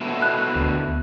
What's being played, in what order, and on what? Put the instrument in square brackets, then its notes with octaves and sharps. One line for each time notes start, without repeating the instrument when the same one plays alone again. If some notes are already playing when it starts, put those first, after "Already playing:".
[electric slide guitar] B2 E4 A4
[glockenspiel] F#6
[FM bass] D2